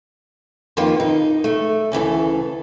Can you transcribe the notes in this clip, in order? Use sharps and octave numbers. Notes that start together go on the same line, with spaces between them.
F2 D#3 F3 A#3 F4 B4
D#4
A3
D2 C#3 E3 A4